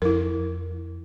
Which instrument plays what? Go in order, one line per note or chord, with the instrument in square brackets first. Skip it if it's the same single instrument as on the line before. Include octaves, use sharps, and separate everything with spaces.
[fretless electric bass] F2 [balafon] E4 A#4